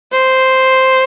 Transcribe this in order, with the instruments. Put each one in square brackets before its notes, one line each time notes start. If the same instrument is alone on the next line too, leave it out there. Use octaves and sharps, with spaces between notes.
[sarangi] C5